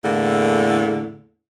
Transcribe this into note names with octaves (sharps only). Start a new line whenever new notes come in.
E2 A2 D3 A#3